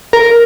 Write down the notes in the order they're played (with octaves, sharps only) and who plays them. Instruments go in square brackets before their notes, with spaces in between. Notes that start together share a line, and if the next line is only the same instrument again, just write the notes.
[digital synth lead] A#4